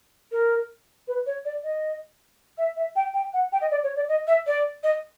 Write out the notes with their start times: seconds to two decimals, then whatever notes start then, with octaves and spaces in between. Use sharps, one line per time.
0.31 A#4
1.07 B4
1.26 C#5
1.45 D5
1.63 D#5
2.57 E5
2.76 E5
2.95 G5
3.13 G5
3.33 F#5
3.52 G5
3.61 D#5
3.71 D5
3.83 C#5
3.96 D5
4.08 D#5
4.27 E5
4.46 D5
4.83 D#5